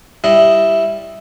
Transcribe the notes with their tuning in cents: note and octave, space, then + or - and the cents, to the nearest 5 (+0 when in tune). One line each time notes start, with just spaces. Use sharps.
G3 +0 E4 +0 D#5 +0